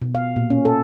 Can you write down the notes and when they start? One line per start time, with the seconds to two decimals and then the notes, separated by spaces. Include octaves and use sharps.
0.02 B2
0.15 F5
0.36 A#2
0.50 C#4
0.65 A4